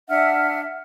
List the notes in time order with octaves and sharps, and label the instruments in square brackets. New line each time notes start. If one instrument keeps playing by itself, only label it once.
[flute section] D4 E5 F#5 F6